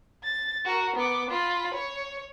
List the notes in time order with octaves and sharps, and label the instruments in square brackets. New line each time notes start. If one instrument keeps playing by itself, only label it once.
[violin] A6
F#4 A#4
B3 D6
F4 B5
C#5